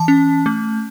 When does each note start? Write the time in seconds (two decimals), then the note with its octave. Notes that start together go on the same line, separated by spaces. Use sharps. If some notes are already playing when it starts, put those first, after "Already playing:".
Already playing: E3 A5
0.08 C#4
0.46 A3